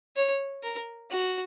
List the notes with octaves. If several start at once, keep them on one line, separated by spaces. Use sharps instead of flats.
C#5
A#4
F#4